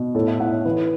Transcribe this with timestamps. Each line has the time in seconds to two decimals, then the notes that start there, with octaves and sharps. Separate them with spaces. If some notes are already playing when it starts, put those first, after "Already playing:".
Already playing: B2
0.15 A2 A4
0.28 E5
0.40 A2 F#5
0.52 C#5
0.65 E3 B4